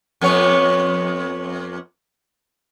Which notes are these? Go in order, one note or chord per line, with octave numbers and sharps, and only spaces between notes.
F2 B3 C#5